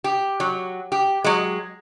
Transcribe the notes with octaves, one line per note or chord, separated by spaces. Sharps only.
G4
F#3
G4
F#3 G#3